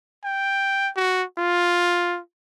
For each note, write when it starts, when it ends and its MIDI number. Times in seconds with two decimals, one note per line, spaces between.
0.24 0.90 79
0.97 1.24 66
1.38 2.19 65